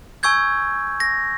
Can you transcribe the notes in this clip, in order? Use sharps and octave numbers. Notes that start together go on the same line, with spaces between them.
G#5 C#6 E6 G6 G#6
A#6